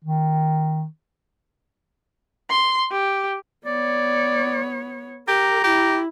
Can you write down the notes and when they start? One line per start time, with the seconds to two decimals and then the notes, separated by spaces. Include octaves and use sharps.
0.04 D#3
2.50 C6
2.92 G4
3.66 B3 C#5 D5
5.28 G4 A#4 A#5
5.64 E4 G4